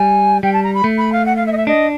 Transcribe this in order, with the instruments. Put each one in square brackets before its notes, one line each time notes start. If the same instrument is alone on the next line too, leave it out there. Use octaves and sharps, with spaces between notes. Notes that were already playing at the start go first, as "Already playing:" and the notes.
Already playing: [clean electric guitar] G3 [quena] G#5
[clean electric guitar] G3 [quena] G5
[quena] A5
A#5
B5
[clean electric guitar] A3
[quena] B5
F5
F#5
F5
E5
D#5
E5
[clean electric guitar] D4 [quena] D#5